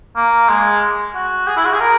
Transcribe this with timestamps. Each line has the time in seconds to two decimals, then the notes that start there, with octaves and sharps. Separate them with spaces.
0.16 A#3
0.49 G#3
1.15 F#4
1.47 G#4
1.57 E4
1.65 F#4
1.73 G#4
1.80 A#4